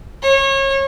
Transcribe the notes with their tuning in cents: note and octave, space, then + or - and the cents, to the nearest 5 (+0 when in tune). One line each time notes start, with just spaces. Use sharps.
C#5 -30